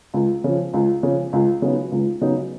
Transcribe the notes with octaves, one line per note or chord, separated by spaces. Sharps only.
C#2
C#3 F3
C#2
C#3 F3
C#2
C#3 F#3 B3 D#4
C#2
C#3 F#3 B3 D#4